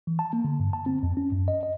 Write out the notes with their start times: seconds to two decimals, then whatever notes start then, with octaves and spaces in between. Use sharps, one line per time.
0.07 E3
0.19 A5
0.33 A#3
0.44 D3
0.60 G2
0.73 A5
0.86 C4
1.03 F2
1.17 C#4
1.32 F#2
1.48 D#5
1.63 D#5